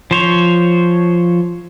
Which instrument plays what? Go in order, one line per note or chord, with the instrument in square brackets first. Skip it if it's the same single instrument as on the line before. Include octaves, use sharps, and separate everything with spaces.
[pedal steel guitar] F3 C5 C#5